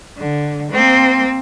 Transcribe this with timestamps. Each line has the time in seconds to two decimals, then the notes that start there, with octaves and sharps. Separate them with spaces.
0.17 D3
0.71 A#3 C4